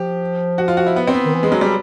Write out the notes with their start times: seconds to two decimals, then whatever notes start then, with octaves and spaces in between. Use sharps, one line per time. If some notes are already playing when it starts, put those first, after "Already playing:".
Already playing: F3 G4
0.58 F#4
0.68 F4
0.77 F#4
0.87 E4
0.96 B3
1.07 C4
1.14 B3
1.25 D#3
1.34 E3
1.43 G#3
1.52 F#3
1.61 G3